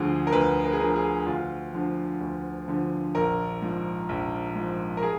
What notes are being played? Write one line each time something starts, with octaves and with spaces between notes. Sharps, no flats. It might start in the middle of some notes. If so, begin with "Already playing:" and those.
Already playing: D2 D3 F3 G#4
A#4
D2 B4
A#4
G#4
D3 F3 A#4
G#4
D2 F4
D3 F3
D2
D3 F3
A#1 A#4
G#2 F3
A#1
G#2 F3
A#4
G#4